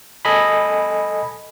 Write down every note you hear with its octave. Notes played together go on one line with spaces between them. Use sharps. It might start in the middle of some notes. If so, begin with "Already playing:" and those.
A4 D#5 G#5 B5